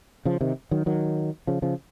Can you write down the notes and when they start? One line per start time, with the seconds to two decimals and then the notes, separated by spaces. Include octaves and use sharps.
0.25 C#3 F3
0.41 C3 D#3
0.71 D#3 F#3
0.86 D#3 F#3
1.47 C#3 F3
1.62 C#3 F3